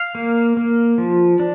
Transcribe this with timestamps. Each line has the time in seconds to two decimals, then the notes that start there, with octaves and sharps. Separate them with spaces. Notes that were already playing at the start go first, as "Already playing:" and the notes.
Already playing: F5
0.15 A#3
0.57 A#3
0.98 F3
1.40 D4